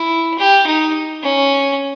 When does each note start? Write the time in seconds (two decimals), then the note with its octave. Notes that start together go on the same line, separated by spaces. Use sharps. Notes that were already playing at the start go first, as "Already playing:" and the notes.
Already playing: E4
0.39 G4
0.67 D#4
1.23 C#4